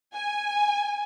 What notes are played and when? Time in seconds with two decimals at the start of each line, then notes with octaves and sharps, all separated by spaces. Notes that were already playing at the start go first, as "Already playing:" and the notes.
0.14 G#5